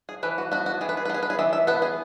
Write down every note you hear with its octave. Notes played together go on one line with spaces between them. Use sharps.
G#4
E3 B4
F#4
B3 F#4
F#4
E3 G#4
B4
G#4
B4
B3 G#4
B4
G#4
E3 E5
E5
B3 B4
G#4